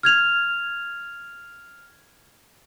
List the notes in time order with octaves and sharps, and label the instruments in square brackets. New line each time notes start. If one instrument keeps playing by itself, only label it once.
[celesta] F6 G#6 F7